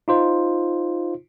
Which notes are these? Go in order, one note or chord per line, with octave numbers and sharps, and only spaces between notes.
D#4 F4 C5